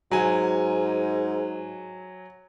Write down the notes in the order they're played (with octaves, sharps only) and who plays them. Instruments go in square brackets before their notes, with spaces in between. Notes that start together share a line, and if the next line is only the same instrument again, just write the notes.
[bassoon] G#2 [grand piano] F#3 G#5